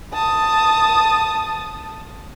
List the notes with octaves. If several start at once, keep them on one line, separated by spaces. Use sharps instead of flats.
A5 D#6